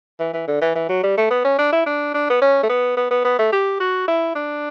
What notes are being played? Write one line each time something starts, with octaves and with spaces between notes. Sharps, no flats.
E3
E3
D3
E3
E3
F#3
G3
A3
B3
C#4
D4
E4
D4
D4
B3
C#4
A3
B3
B3
B3
B3
A3
G4
F#4
E4
D4